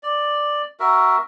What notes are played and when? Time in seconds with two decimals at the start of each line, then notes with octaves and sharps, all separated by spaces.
0.03 D5
0.80 F#4 A#4 E5